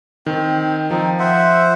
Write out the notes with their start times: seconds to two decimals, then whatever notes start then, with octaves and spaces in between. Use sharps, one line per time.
0.26 D#3 C4
0.91 F3 C4 D#4
1.19 C5 E5 F#5